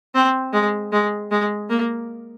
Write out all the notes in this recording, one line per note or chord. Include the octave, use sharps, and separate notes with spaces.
C4
G#3
G#3
G#3
A#3